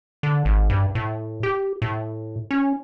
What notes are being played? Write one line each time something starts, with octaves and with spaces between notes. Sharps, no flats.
D3
G#1
G2
A2
G4
A2
C#4